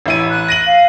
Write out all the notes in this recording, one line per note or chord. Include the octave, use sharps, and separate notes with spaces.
A1 E4 D#7
F#6
A#6 D#7 F#7
F5